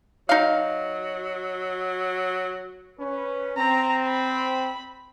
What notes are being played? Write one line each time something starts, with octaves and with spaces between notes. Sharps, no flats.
F#3 D#4 F5
C#4 B4
C4 A#5
B5